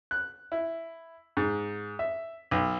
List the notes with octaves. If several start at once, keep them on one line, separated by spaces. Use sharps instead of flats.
F#6
E4
G#2
E5
B1